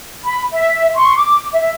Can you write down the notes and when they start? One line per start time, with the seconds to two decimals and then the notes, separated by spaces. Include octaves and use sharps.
0.24 B5
0.52 E5
0.95 C6 C#6
1.16 D6
1.53 E5